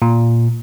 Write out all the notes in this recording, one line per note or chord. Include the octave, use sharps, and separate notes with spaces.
A#2